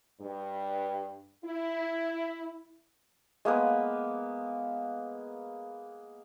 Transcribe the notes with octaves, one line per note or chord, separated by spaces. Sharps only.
G2
E4
G#3 A#3 B3 B4